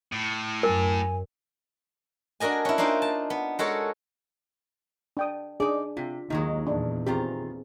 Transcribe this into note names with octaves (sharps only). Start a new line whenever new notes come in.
A2
F#2 A#4 G#5
D4 F#4 A#4 D#5 G#5
C#4 E4
A#3 D4 D#4 F4 C5
A5
B3
G#3 F#4 A4 A#4 C#5
D4 G5 D#6
D4 D#4 G#4 D5
C3 F4
D#2 D#3 F#3 G#3 D#4
E2 A#2 D4
D#3 C4 F4 G4 G#4 A#5